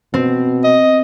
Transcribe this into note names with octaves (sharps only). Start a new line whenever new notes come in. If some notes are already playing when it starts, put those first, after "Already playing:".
B2 C4
D#5